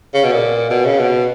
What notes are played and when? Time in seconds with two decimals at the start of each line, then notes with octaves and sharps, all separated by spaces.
0.14 C#3
0.24 B2
0.32 A#2
0.70 B2
0.85 C#3
0.99 B2